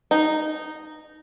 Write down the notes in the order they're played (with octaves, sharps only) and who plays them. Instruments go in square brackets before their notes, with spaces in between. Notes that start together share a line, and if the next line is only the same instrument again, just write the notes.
[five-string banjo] D#4